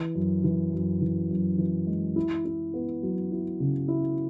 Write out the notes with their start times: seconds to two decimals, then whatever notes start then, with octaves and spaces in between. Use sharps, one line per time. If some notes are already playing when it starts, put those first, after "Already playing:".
Already playing: E3
0.15 F#2
0.44 E3
0.73 F#2
1.01 E3
1.31 F#2
1.58 E3
1.87 G#3
2.16 E4
2.45 E4
2.74 B3
3.03 F#3
3.32 E4
3.60 C#3
3.88 E4